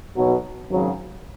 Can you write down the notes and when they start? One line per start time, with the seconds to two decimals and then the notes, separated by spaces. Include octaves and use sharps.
0.16 B1 B2 F#3
0.69 G#1 F#2 C#3 F#3